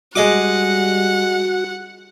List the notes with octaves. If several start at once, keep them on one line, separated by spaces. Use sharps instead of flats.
G3 G#3 F#4 D#5 F#5 D6